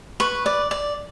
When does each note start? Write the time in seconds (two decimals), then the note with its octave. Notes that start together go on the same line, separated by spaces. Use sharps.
0.20 B4 C#6
0.46 D5
0.71 D5